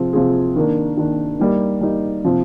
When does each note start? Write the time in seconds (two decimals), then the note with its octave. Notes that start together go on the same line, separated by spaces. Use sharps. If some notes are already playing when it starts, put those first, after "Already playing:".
Already playing: C3 F3 C4 F4 G#4
0.13 C3 F3 C4 F4 G#4
0.56 D#3 A#3 D4
0.97 D#3 A#3 D4
1.40 G3 A#3 D#4
1.81 G3 A#3 D#4
2.24 C3 F3 C4